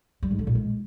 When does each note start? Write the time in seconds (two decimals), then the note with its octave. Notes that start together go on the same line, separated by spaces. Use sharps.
0.23 G3
0.31 G#2
0.39 D3
0.47 A#2
0.55 G#3